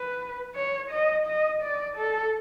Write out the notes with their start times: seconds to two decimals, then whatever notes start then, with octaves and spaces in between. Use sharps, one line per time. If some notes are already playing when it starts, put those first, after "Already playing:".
Already playing: B4
0.55 C#5
0.91 D#5
1.27 D#5
1.62 D5
1.97 A4